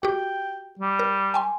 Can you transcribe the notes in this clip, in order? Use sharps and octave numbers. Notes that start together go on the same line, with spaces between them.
F#4 G4 G5
G3
A#4
G5 G#5 C6